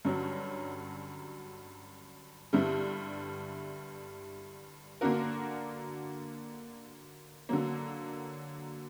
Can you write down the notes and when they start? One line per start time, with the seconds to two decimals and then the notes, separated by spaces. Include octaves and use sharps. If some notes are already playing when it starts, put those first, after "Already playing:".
0.05 G2 D3 F#3 C#4
2.53 G2 D3 G3 B3 E4
5.01 D3 A#3 D4 F#4 A#4
7.49 D3 F#3 A#3